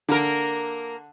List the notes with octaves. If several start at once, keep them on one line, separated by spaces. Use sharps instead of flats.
D3 A#3 A#4